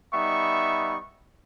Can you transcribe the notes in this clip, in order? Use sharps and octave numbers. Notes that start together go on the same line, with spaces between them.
G3 B3 D#4 E5 C#6